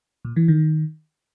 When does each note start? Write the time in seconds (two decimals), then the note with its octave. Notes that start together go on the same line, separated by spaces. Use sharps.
0.25 A#2
0.36 E3
0.48 D#3